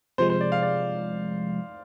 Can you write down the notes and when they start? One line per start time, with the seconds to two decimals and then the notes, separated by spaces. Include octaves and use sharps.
0.18 C3 F3 G#3 C5
0.30 C5
0.41 D5
0.52 F5
0.62 D5